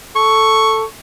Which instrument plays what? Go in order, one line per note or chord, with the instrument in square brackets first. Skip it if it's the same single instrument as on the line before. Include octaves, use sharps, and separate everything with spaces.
[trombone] A4 [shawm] C#6